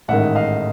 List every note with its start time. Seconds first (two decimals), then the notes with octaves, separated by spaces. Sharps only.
0.08 A1 G#2 D#3 E5 F#5
0.35 D#5 F5